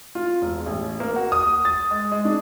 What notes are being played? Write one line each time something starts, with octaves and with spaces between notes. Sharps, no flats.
F4
E1
A1
A#3
F#4
D#6
A6
G#3
G#3
D4